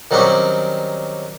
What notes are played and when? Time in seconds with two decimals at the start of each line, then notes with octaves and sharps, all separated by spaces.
0.11 D#3 F#3 G3 C4 C#4 G4